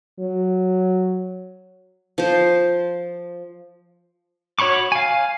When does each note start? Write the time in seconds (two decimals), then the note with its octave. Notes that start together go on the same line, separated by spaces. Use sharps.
0.19 F#3
2.18 F3 C5
4.59 F#4 C#5 B5 C#6 D6
4.92 F5 G#5